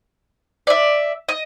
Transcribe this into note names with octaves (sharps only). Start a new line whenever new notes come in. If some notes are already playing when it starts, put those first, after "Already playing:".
D5 E5
D#5